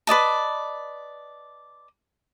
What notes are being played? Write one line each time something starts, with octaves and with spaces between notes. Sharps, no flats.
B4 D5 D#5 A5